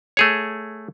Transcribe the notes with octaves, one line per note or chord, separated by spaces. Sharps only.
A3 G#4 C#5